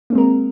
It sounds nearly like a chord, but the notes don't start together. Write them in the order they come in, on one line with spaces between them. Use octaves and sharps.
A#3 C4 G#3 A#4